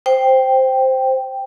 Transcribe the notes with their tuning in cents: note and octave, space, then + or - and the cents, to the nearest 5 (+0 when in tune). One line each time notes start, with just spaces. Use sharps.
C5 +0 G5 +0